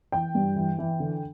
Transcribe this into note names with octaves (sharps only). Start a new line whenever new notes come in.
E3 G5
G2
E3
E3
D3